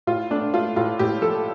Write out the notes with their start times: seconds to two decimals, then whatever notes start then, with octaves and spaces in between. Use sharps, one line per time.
0.07 A2 F4
0.31 A3 D4
0.53 A3 F4
0.76 A2 F4
0.99 A2 G4
1.22 F3 A4